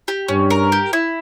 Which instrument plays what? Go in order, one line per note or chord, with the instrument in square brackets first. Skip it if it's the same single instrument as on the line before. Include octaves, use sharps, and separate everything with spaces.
[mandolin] G4
[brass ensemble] G2 [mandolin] C#4
[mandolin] A#4
G4
E4